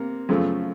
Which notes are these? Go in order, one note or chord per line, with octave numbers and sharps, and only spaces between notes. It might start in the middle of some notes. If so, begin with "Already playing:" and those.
Already playing: C3 A#3
F#2 C#3 F3 A3